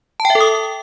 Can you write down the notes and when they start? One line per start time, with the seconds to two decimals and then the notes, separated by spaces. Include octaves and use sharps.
0.20 A5
0.25 G5
0.30 E5
0.35 A4
0.41 D#6